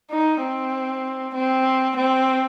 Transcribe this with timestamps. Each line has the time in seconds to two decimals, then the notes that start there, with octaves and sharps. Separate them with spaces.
0.11 D#4
0.42 C4
1.34 C4
1.96 C4